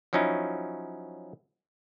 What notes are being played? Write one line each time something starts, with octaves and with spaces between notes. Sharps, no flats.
F3 F#3 C#4 D#4 E4